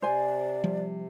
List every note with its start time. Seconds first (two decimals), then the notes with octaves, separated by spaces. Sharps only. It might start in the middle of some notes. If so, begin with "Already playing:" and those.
0.02 C3 C5 D5 G#5
0.64 F3 G3